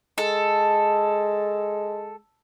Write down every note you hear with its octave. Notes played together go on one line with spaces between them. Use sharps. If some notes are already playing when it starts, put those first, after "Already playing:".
G#3 A4